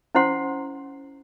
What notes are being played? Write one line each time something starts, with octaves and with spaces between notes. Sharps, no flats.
C#4 E4 C5 F#5 C6